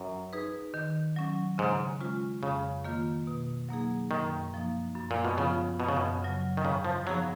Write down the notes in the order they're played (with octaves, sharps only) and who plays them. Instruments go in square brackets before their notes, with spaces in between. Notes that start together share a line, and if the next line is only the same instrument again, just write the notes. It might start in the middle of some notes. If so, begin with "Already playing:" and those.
Already playing: [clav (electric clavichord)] F#2
[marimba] D#4 G#4 B4
D#3
F#3 C#4
[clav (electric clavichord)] G#2 [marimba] C#3
[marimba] G#3 C#4 F4
[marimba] F2 [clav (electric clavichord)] C#3
[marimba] D#3 A#3 F4
B2
F#3 A#3 D#4 G#4
[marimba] F#2 [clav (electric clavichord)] D#3
[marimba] F3 A#3 D#4
F#2
[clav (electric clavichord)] A#2
B2
[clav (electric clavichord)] C#3 [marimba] F3 B3 F4
[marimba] F#2 [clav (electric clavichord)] B2
[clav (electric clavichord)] C#3
B2
[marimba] C#3 F#3
[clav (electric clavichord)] D#3
[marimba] G#2 [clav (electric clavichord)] C#3
[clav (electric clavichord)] F3
[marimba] F3 B3 D#4 G#4 [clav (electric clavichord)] F#3